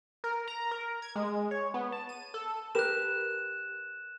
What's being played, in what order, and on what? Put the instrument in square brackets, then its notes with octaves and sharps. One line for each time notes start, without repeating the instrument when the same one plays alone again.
[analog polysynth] A#4
A#5
A#4
G#6
G#3
C#5
B3
A5
D#7
A4
[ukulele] G4 A#4 B4 [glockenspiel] F#6 E7